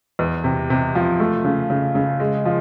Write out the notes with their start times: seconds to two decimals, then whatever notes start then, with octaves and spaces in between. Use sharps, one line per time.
0.19 E2
0.44 C3
0.70 C3
0.95 F3
1.20 A3
1.44 C#3
1.70 C#3
1.95 C#3
2.20 G#3
2.45 F3